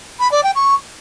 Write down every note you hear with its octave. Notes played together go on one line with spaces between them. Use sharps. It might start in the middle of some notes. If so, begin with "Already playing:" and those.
B5
D5
G5
C#6